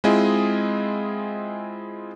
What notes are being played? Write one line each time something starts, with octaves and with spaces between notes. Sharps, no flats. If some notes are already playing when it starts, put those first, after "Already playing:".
G#3 C4 E4 F4 G#4 D#5